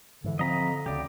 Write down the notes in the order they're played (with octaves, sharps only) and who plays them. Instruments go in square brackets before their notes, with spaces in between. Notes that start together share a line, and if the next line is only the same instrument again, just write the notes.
[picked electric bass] G#2 E3 [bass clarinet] D3
[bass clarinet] D3 [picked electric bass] F3 C4 [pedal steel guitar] D#5 A#5 B5
[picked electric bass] D2 C#3 [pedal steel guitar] G4 D5